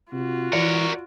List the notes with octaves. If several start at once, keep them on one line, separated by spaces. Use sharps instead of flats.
C3 F4 F#4
E3 A#4 C#5 D5